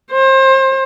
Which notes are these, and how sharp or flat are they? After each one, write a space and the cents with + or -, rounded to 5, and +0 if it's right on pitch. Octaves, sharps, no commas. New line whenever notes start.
C5 +30